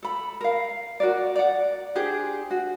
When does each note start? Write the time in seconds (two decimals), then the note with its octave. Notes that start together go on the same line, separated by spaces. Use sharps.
0.03 A4 B5
0.41 A#4 F5
1.00 F#4 A#4 D5
1.36 D5 F#5
1.95 D4 G4 G#4 C5
2.51 F#4